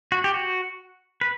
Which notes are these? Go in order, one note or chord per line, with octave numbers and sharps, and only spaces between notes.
F#4
G4
F#4
B4